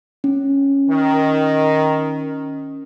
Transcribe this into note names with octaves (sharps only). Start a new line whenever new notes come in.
C#4
D#3